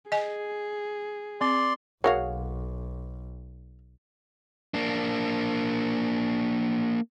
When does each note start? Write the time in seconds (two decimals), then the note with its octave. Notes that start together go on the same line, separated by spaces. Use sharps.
0.12 G#4 D#5 G#5
1.41 C4 D5 C6
2.04 B1 A#3 F#4 G#4 C#5 F5 F#5
4.74 A#3 D4